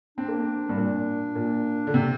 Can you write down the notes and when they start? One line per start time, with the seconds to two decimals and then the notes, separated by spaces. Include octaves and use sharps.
0.18 C4 D4
0.28 A#3
0.39 C4
0.69 G2
0.77 A#2
1.35 A#2
1.87 D3
1.94 C3 C4